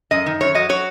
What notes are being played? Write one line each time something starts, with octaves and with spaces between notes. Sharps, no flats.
F#2 D#5
D#3
F#2 C#5
F#3 D#5
F#3 C#5